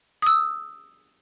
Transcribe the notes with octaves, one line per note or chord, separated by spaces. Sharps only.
D#6 E6